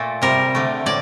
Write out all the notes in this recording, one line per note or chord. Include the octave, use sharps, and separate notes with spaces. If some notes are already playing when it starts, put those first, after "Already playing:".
Already playing: A#2 A3
C3 G3 A#4
D3 A3
A2 D5